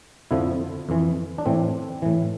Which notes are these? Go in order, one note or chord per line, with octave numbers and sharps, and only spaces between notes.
F2 D3 F3 E4
F2 E3
D4
A2 E3 C4
A2 E3